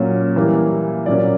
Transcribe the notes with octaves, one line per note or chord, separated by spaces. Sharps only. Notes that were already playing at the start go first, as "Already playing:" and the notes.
Already playing: A#2 F#3 A#3 C#4
E3 G3 A#3
A#2 F#3 A#3 C#4 D5